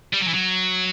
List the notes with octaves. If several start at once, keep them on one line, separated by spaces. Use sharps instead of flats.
G3
F#3
E3
F#3